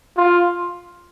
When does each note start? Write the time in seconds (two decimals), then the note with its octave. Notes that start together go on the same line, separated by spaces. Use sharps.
0.17 F4